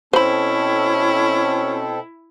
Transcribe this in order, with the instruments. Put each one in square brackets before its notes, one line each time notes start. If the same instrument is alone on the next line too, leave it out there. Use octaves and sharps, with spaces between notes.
[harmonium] B2 C4 A4 [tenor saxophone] C#4 [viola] E4 [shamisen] C5 B5